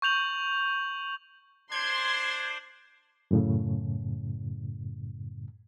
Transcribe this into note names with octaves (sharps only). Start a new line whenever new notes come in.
C#6 G6 F7 F#7
D4 C5 C6 G#6
F#2 A2 C#3